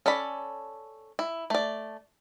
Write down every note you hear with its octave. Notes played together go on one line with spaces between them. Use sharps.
C#4 A4 D5 B5
E4
A3 D5